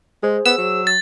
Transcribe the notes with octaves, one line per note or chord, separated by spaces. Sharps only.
G#3 G#4 C5
B3 E6
F#3
A6